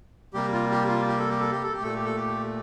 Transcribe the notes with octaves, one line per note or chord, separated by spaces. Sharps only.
C3 G3 A#3 G4
F4
G4
F4
G4
A4
G4
A4
G4
A4
G4
A#2 A3 A4
G4
A4
G4